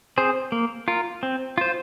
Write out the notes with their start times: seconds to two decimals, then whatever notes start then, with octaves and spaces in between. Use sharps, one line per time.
0.18 C4 G#4 C5
0.52 A#3
0.88 F4 A#4
1.23 C4
1.58 F4 C5